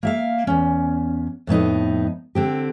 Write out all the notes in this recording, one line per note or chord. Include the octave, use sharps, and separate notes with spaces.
A#3 E5 F5
E2 C#4
F2 A2 B3 D#4
D3 C4 G4